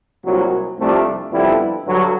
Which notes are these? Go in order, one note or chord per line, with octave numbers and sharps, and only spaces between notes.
C2 A#2 F#3
C2 C3 F3 A3 D4
F2 D3 G3 B3 E4
G2 D3 F#3